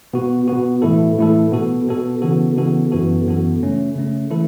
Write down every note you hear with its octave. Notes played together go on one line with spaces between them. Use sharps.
B2 B3 F#4
B2 B3 F#4
A2 E3 A3 E4 A4
A2 E3 A3 E4 A4
B2 B3 F#4 A4
B2 B3 F#4 A4
C#3 E3 B3 F#4 A4
C#3 E3 B3 F#4 A4
F#2 E3 B3 F#4 A4
F#2 E3 B3 F#4 A4
C#3 A3 C#4
C#3 A3 C#4
E3 A3 E4 A4